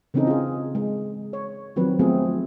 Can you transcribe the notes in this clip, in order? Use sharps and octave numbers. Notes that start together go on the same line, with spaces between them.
C#3 E3 C4 C#4 D#4 A4
F4 G#4
G#3
C#5
D#3 F3 F#3 C4 B4
F3 F#3 A3 B3 C4 G#4